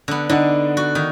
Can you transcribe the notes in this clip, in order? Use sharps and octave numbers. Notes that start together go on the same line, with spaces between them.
D3 B3
D3 D4 D#4 F#5
F#4
D#3